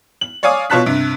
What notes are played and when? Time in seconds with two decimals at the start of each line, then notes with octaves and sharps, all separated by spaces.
0.21 F#7
0.43 C#5 D5 F5 G#5 D6 D#6
0.70 B2 F4 C#5 A5 F#6 B6
0.86 G2 C3